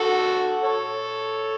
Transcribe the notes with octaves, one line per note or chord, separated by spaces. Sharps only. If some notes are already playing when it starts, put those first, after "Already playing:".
Already playing: F#4 A4
A4 C#5